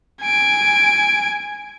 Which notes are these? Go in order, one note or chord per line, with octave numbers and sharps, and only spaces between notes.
G#5 D7